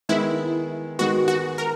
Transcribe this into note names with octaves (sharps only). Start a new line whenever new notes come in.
D#3 G#3 B3 E4
D#3 G#3 B3 F#4
F#4
A#4